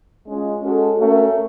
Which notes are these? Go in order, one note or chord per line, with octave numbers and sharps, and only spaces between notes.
G#3 C#4 F4
G#3 C#4 F#4 A4
A3 C#4 F#4 A#4